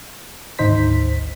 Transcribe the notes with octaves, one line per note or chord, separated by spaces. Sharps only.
G#1 D2 D#4 C5 B6